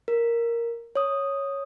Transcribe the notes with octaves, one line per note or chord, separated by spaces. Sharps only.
A#4
C#5 D#6